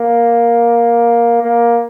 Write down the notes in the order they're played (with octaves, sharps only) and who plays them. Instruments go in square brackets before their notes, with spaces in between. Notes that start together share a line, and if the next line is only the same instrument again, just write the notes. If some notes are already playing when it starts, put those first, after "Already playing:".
Already playing: [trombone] A#3
A#3